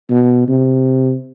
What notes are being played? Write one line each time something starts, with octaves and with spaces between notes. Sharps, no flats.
B2
C3